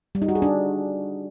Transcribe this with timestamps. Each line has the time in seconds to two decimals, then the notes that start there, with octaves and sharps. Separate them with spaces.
0.15 G3
0.22 D#4
0.28 F#4
0.35 G#4
0.42 D4